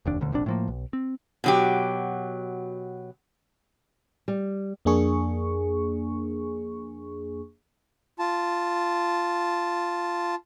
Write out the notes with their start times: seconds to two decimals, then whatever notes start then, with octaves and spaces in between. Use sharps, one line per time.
0.06 F1 D#2 D4
0.21 D#1 D2 D3
0.32 F1 A#1 F2 D4
0.46 A2 F3 A#3
0.68 B1
0.93 C4
1.44 B2 F#3 G4
4.28 G3
4.85 F2 A#3 D4 G#4 C#6
8.19 F4 A5